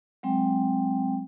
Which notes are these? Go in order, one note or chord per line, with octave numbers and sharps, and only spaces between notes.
F#3 G#3 C4 G5